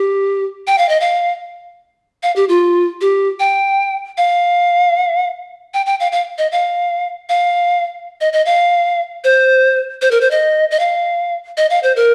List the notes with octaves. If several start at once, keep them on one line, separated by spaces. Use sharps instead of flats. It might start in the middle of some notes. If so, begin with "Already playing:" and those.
Already playing: G4
G5
F5
D#5
F5
F5
G4
F4
G4
G5
F5
G5
G5
F5
F5
D#5
F5
F5
D#5
D#5
F5
C5
C5
A#4
C5
D#5
D#5
F5
D#5
F5
C5
A#4